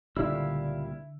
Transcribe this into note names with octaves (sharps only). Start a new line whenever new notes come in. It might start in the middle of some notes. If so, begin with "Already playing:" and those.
C#2 A#2 D3 G3 E4 F5 B5 E6